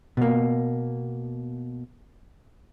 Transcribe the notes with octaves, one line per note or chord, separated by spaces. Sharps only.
B2 A#3